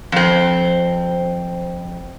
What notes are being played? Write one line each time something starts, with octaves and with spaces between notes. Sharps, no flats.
F2 C4